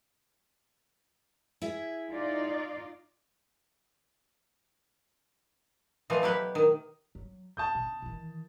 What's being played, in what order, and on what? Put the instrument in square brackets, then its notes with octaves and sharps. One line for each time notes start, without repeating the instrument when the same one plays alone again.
[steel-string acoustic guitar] E4 G#4 E5
[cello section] D#4 F4 D5
[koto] B2 E3 F3 A3
F#3 E4 G4 B4
D#3
[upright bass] F#3
[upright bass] F#2 [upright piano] A5 D#6 G6
[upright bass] B2 D3
D#3 E3